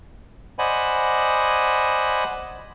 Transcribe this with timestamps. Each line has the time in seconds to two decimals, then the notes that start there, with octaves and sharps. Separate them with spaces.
0.59 C5 D5 D#5 F#5 G#5 B5